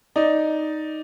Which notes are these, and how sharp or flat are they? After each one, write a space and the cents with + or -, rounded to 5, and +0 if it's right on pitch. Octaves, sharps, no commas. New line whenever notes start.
D#4 +0 D5 +0